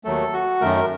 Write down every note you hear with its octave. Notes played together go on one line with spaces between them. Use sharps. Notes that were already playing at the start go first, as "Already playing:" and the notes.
D#2 D#3 F#3 A3 A4
F#4
F#2 D#3 A3 A#4